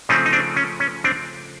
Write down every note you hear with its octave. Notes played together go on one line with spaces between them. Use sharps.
C#3 F3 A3 C4 C#4 D#4
D#4
C4 D4
C#4
C#4
C4 D4